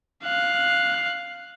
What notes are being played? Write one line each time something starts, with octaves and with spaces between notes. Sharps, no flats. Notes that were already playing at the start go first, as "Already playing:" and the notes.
F5 F#6